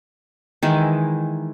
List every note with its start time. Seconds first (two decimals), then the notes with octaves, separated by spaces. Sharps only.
0.63 D#3 E3 G#3 E4